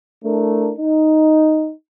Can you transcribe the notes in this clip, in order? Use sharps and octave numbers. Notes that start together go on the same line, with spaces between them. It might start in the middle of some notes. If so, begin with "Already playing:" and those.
A3 D4 E4 A#4
D#4